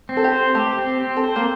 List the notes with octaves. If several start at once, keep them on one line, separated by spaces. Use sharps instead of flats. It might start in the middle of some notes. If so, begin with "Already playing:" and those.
C4
A4
G4
C5
A3 G4
C4
C4
A4
C5
A#3